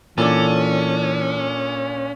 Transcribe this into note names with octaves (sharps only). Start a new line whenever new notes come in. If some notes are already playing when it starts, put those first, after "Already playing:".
A#2 E3 C#4 D4 A4 A5